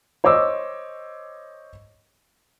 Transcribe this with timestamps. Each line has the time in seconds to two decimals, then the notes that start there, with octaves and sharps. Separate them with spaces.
0.24 C5 C#5 D#5 D6 E6